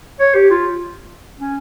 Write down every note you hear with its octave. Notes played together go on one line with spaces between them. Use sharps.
C#5
G4
F4
C#4